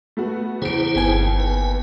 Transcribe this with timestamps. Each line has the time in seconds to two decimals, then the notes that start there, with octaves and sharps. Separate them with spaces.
0.17 A3 B3 F#4
0.62 E2 C#3 E4 G#4 C5 D7
0.96 G1 D#2 B3 G#5
1.40 B4